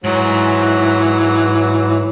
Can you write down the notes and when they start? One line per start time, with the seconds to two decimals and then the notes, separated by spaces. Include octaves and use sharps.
0.04 G#2 E3 F#3